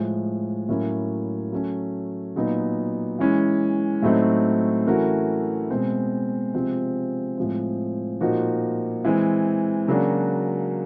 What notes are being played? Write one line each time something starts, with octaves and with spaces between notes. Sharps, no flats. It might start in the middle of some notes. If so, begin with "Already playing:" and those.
Already playing: A2 F3 G#3
A2 F#3 A#3 C#4 E4
F#3 A3 C#4
A#2 F#3 B3 D#4
E3 G#3 C#4 E4
A2 F#3 A3 C4 D#4
E3 A3 C#4 F#4 A#4
B2 G#3 C4
C3 F3 G#3 C4
A2 F3 G#3 C4
A#2 F3 A#3 D#4 F#4
E3 G#3 C4
C#3 F#3 A#3 D4 F#4